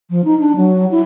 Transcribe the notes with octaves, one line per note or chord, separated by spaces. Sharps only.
F3
D#4
D4
F#3
E4